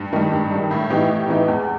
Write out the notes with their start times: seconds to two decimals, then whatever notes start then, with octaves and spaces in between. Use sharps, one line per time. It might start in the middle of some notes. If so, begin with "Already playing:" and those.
Already playing: G2
0.13 D#3 G3
0.32 G2
0.51 D#3 G3
0.71 A2
0.90 E3 B3 D#4 G4
1.09 A2
1.29 E3 B3 D#4 G4
1.48 E2